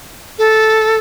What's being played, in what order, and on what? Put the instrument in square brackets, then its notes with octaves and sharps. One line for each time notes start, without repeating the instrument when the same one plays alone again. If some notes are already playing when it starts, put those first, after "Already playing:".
[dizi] A4